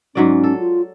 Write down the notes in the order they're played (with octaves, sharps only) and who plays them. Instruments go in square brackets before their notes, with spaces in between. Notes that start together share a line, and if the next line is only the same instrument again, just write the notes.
[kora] G#2 F#3 D5 [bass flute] C#4
[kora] A4
[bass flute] F4